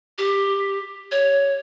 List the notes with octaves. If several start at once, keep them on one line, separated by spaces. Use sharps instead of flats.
G4
C#5